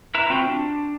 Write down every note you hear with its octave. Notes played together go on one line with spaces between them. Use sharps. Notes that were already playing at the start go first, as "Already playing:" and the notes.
E4 B4 A#5
C4 F4 F#4 G5
D4